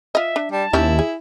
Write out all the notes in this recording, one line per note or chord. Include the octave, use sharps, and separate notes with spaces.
F4 D#5 E5
D4
G3 A5
D#2 C4 C#4 E4 G4
G#4